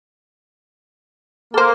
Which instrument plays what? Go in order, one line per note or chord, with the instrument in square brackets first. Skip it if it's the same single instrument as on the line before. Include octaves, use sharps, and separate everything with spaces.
[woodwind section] A#3 [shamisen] A4 C5